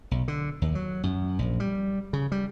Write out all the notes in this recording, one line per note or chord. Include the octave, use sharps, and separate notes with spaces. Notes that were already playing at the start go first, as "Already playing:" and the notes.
B1
D3
D#2
F#3
F#2
A#1
G3
C#3
G3